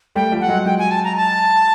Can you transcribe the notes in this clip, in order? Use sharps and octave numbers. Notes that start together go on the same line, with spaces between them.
G3 A3 G5
F3 G3
F#5
F#3 G#3
F#3 G#3 G5
G#5
A5
A#5
A5